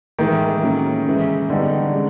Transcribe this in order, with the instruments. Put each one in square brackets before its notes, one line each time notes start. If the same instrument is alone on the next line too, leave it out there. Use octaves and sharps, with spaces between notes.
[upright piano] A2 E3 G#3 [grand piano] D#3
[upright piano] A2 F#3 A#3 C#4
C#3 E3 G#3
[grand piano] D3 [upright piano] G3 B3 D#4 G4
[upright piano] G#3 C#4